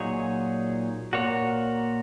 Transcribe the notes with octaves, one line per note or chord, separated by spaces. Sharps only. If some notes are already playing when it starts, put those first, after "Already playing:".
Already playing: A#2 F#3 D#4 G#4 C#5
A#2 A#3 F#4 C#5